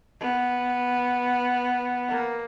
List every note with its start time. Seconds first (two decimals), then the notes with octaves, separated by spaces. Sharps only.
0.20 B3
2.09 A#3